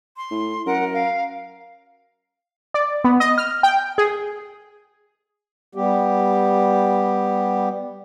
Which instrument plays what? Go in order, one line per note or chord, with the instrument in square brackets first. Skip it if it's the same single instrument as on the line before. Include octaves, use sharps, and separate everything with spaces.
[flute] C6
[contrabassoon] A2
[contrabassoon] F#2 [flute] A#4 [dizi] F#5
[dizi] F5
[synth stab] D5
B3
D#5
F6
G5
G#4
[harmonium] G3 B3 G4